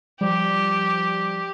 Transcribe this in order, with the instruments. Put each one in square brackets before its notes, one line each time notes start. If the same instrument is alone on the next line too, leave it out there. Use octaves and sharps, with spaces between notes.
[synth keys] F3 G3 [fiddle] G4